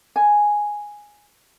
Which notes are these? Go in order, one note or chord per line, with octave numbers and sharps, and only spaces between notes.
G#5